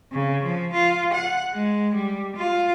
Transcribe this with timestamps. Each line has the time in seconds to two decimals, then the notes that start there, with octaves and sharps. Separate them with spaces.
0.13 C#3
0.43 F3
0.73 F4
1.14 F#5
1.53 G#3
1.95 G3
2.36 F4